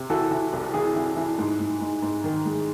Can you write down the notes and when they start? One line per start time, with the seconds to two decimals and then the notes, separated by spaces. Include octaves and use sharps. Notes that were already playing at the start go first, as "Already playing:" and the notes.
Already playing: C3
0.10 E3 F#4 A4
0.31 E3
0.53 C2
0.74 E3 G#4
0.96 E3
1.17 E3
1.39 G#2
1.60 G#2
1.81 G#2
2.02 G#2
2.24 D#3
2.45 G#3